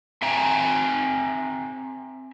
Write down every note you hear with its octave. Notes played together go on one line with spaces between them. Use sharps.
C4 E5 G5 G#5 A#5